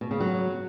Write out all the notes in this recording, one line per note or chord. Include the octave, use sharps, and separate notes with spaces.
B2
C#3
F#3